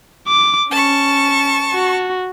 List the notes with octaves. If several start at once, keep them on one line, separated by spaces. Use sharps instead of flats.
D6
C#4 A5 C#6
F#4